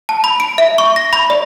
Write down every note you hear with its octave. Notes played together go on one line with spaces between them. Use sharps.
A5
B5
D7
E5
C#6
A#6
B5
D5